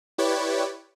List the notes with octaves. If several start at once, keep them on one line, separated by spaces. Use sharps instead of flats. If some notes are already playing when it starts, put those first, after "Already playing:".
E4 G4 B4 C#5 D5